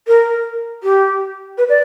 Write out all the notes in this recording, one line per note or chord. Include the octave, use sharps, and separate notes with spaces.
A#4
G4
B4
D5